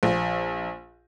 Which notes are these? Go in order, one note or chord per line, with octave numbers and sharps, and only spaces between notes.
A#1